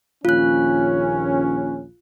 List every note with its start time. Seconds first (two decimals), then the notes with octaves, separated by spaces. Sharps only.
0.25 A#1 D#2 C#4 F4 F#6